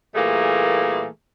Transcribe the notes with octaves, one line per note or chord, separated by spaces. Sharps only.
A#2 E3 G3 A3 A#3 G#4